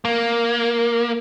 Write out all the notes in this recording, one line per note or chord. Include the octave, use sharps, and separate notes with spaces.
A#3